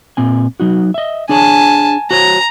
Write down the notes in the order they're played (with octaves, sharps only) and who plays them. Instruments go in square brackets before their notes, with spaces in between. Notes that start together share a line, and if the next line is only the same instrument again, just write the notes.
[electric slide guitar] A#2 C4 G#5
F#3 D#4 F#4
D#5 E5
[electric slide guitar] D4 G#4 C#5 [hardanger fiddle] G#5 A5
[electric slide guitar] F#4 C5 C#5 [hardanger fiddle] A#5